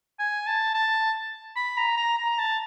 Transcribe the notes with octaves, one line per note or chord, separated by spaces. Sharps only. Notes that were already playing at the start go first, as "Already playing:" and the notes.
G#5
A5
A5
B5
A#5
A#5
A#5
A5